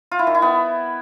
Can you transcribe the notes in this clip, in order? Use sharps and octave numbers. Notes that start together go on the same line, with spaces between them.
F4
E4
D#3
E4
B3